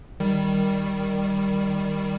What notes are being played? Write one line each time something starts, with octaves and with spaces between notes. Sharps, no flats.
D#3 G3